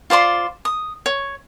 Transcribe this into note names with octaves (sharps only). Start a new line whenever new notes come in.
F4 C5 D5 C6
D#6
C#5